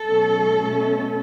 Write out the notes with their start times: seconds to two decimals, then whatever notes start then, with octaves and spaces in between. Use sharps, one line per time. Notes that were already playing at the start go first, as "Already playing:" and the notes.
Already playing: A4
0.09 B2 F#3 A3 C#4
0.61 B2 A3 C#4